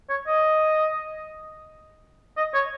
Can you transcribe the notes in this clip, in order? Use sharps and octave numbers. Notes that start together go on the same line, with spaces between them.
C#5
D#5
D#5
C#5